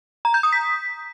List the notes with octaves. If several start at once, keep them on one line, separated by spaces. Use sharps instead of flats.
A#5
G6
D#6
B6